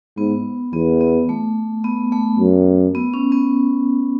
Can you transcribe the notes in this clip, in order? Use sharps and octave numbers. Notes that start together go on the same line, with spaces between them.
G#2 B3
E2 B3
B3
A3
B3
A3
F#2
B3
C#4
B3